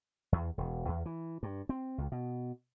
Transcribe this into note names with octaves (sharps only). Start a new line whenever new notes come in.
E2
E1
E2
E3
G2
C4
C#2
B2